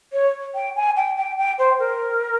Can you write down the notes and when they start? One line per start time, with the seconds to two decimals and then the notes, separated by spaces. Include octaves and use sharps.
0.13 C#5
0.55 G5
0.76 G#5
0.96 G5
1.17 G5
1.38 G5
1.58 C5
1.79 A#4